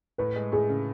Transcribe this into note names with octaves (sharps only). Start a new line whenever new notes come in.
A2 B4
G#3
A2 G#4
C#3